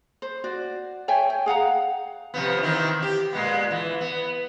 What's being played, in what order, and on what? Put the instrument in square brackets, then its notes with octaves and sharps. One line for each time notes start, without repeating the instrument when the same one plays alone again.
[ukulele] C5
F#4 D5
C#5 E5 G5 G#5
G5
G#4 F5 F#5 A#5
[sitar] C3 F3 B3
D#3 E3 C4
G4
A#2 G#3 B3
E3
B3